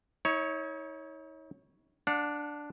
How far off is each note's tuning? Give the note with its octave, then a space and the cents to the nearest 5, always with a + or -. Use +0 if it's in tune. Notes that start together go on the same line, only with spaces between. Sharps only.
D#4 +45 C#5 +0
D4 +0 F#5 -40